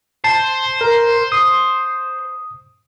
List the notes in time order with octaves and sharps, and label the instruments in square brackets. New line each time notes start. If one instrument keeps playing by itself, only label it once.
[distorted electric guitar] C5 [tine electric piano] A5
[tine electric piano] A#4
D#6